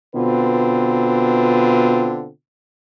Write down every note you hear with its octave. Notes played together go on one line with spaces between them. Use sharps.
B2 D3 C4 F4 B4